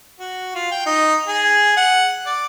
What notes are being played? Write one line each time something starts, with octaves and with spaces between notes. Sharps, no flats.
F#4
F4
G5
D#4
G#4
F#5
D5